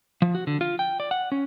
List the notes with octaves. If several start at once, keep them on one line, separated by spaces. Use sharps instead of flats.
F3
F#4
D3
F4
G5
D5
F#5
C#4